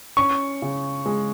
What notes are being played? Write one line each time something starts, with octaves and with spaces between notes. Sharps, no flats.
C#4 C#6
C#3
G#3